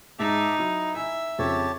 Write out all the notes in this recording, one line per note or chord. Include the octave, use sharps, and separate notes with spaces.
G#2 D#4 G#4 E5 A5 D6
F#3 E4
E5 G#5
F2 C#3 G4 C#5 A5